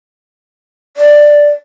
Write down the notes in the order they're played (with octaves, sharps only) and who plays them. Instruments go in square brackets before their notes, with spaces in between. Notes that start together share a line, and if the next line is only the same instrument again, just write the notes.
[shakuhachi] D5